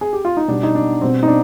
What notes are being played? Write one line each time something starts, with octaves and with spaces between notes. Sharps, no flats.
G#4
G4
F4
D#4
B2 G3 D4
D#4
D4
B2 G3 C4
D#4
D4